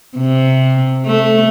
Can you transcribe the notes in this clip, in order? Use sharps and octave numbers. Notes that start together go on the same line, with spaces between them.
C3
A3